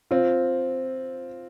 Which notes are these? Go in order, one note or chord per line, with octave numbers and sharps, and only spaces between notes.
C4 F4